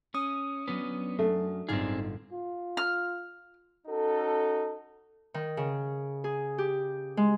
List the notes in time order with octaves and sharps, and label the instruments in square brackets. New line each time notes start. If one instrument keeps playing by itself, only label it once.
[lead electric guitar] C#4 [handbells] D#6
[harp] F#3 D4 [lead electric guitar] B3 C#4
[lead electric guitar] F#2 [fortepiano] A3
[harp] G1 A2 F5 [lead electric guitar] C4 G#4 [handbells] D#4
[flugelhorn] F4
[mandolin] F6
[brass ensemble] C#4 D#4 F#4 A4
[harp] D#3
C#3
G#4
G4
G#3